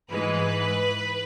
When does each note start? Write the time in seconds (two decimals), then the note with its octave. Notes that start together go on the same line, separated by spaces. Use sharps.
0.10 G#2 E3 G#3 B4